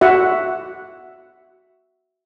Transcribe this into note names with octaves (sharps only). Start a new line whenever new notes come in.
F#4 E5 F#5